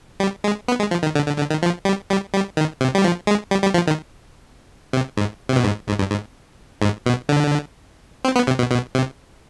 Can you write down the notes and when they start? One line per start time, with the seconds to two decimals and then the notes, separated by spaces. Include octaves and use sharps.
0.20 G3
0.44 G#3
0.68 B3
0.80 G#3
0.91 F3
1.03 D#3
1.15 D3
1.27 D3
1.38 D3
1.50 D#3
1.63 F3
1.85 G3
2.10 G3
2.33 G3
2.57 D#3
2.81 C3
2.95 G3
3.04 F3
3.27 G#3
3.51 G3
3.63 G3
3.74 F3
3.87 D#3
4.93 C3
5.17 G#2
5.49 C3
5.56 B2
5.64 G#2
5.88 G#2
5.99 G2
6.11 G#2
6.82 G#2
7.06 B2
7.29 D3
8.25 C4
8.36 B3
8.47 C3
8.59 B2
8.71 B2
8.95 C3